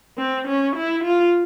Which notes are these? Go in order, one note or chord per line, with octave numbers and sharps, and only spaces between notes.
C4
C#4
E4
F4